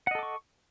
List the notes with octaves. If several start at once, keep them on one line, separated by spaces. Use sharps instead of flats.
A4 D#5 F#5 C#6 D6